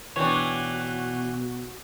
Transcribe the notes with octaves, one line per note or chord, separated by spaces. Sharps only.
B2 E3 D4 F#4 C#5 G5